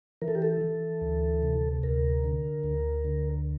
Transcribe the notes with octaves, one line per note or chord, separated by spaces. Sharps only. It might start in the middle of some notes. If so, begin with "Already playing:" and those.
E3 A#4
A4
G4
A4
E3
D2
C3
D2 A#4
D3
D2
D3